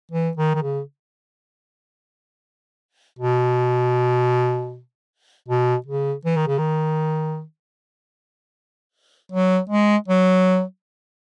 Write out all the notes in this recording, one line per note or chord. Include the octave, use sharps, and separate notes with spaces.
E3
D#3
D#3
C#3
B2
B2
C#3
E3
D#3
C#3
D#3
F#3
G#3
F#3